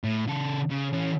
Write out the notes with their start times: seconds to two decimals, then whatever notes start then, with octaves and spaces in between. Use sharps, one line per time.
0.04 A2
0.27 C#3 A4
0.70 C#3
0.93 E3 C#4